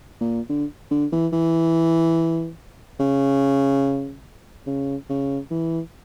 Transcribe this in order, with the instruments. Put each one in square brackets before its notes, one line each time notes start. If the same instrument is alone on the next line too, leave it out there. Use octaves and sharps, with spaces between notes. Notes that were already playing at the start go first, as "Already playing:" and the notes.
[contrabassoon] A#2
D3
D3
E3
E3
C#3
C#3
C#3
E3